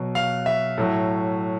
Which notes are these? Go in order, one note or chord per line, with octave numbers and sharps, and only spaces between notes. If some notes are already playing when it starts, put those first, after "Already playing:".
Already playing: B2 F#3
F5
E5
A2 F#3